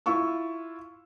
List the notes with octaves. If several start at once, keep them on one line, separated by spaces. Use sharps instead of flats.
E4 F4 C#6 E6